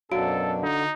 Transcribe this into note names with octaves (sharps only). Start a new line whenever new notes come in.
F#2 B2 F#3 D4 F#4 A4 F5 D7
D3 D#4